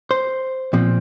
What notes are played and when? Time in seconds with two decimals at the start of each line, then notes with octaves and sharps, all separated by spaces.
0.11 C5
0.73 A#2 F3 C4